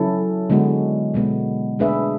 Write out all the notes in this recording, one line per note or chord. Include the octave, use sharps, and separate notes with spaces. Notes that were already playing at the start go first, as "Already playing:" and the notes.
Already playing: C#3 F#3 C#4 E4 A4
D3 G#3 B3 F#4
B2 G#3 B3
A3 D4 G#4 B4 E5